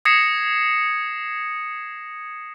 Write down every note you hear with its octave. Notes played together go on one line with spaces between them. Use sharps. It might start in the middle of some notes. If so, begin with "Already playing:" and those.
D#6 G#6 A#6 C7 C#7 E7